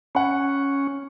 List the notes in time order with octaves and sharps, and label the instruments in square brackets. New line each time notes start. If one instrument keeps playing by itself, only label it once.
[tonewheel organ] C#4 [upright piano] F#5 G#5 B5